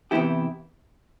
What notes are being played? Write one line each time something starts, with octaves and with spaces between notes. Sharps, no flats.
C3 E3 B3 E4 G4